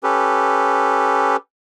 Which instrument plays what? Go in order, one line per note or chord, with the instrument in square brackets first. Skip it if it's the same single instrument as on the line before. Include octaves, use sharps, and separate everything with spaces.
[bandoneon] C#4 G4 A4 B4